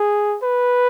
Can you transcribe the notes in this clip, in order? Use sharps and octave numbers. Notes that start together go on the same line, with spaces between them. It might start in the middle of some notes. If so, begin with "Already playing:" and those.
Already playing: G#4
B4